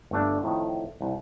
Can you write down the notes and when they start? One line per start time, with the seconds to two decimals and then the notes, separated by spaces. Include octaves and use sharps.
0.11 G1 A3 D4
0.43 F2 A2 D#3
1.01 C2